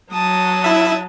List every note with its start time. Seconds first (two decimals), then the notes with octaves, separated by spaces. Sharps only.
0.12 F#3 A5 D#6
0.64 E4 E5